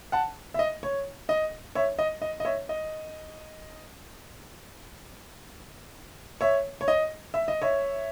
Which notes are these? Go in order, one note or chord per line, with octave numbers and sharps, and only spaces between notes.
F#5 A5
E5
D#5
C#5
D#5
C#5 E5
D#5
D#5
D#5
C#5 E5
D#5
C#5 E5
C#5
D#5
E5
D#5
C#5 E5